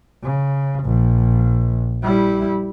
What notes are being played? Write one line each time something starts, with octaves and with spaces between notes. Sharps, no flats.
C#3
A#1
G3 E4